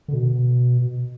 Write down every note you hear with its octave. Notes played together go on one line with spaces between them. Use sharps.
D3
B2